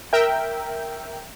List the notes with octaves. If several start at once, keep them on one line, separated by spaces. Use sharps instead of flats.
A#4 E5 G5